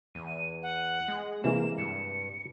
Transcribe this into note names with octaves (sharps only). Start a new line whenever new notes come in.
E2 D#7
F#5
G#3
C3 E3 G#3 A#3 E7
G2 C#7